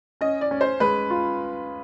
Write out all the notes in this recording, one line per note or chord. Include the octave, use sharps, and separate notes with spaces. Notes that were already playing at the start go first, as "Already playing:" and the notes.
C#4 D#5
D5
C#4
C5
G#3 B4
F4